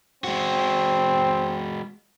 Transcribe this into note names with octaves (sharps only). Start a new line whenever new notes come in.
G#3 C4 F#4